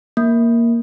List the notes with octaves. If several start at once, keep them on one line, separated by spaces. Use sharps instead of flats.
A#3